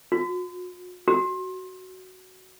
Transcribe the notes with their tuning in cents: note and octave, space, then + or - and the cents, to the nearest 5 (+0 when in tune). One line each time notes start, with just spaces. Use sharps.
F#4 -45
F#4 +10